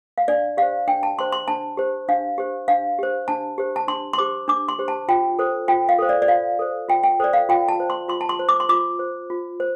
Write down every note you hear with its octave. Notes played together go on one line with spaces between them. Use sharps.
F5
D4 D5
G4 C5 F5
D4 G5
A5
G4 C5 C6
C6
D4 A5
G4 C5
D4 F5
G4 C5
D4 F5
G4 C5
D4 A5
G4 C5
A5
D4 C6
C6
G4 C5 D6
D4 D6
C6
G4 C5
A5
F4 G5
A4 C5
F4 G5
F5
A4 C5
D5
D5
F4 F5
A4 C5
F4 G5
G5
A4 C5 D5
F5
F4 G5
A5
C5
C6
F4 C6
A5
C6
C5
D6
C6
F4 D6
C5
F4
C5